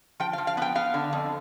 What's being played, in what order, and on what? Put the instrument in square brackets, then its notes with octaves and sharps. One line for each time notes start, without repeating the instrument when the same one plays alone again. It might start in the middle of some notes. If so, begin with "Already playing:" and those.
[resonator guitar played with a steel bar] F3 G5
F5
F3
F5
B3 G5
B3 F5
D3
F2